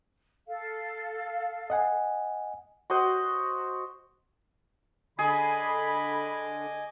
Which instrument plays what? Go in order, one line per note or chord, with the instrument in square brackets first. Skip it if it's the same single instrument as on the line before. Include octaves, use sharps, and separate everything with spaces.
[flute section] A4 F5
[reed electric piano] D#5 F#5 G#5
[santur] F#4 C5 D#5
[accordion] D3 [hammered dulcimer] G#4 [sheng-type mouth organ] D#5 G#5 D6 [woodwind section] B5